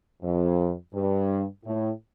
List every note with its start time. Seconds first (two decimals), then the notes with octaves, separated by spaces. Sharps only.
0.22 F2
0.94 G2
1.65 A2